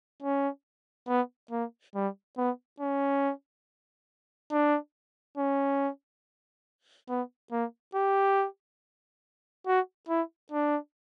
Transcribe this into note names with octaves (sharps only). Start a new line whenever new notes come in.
C#4
B3
A#3
G3
B3
C#4
D4
C#4
B3
A#3
G4
F#4
E4
D4